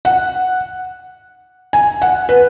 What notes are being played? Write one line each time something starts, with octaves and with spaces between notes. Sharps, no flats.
F#5
G#5
F#5
B4